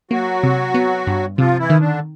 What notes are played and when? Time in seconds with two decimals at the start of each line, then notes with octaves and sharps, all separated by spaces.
0.11 F#3 A#3 F#4
0.43 C3
0.74 B3
1.07 G2
1.38 C3 F3 F4
1.59 E3 E4
1.70 D#3
1.80 D3 D4